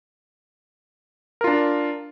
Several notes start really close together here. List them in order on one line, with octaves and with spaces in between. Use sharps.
A#4 F4 D4